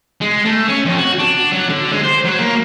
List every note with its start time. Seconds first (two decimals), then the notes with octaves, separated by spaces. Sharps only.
0.21 G#3
0.45 A3
0.68 C#4
0.85 F2
0.98 F#4
1.19 D4
1.52 F#3
1.69 D3
1.91 G#3
2.04 C5
2.24 F#3
2.39 A#3